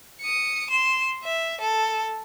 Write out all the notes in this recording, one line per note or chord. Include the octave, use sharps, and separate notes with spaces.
D#6 C#7
C6 E7
E5
A4